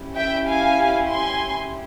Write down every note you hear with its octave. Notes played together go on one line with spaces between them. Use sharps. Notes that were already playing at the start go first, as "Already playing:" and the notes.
Already playing: C#4 E4 G4
E5 G5
F5 G#5
G#5 C6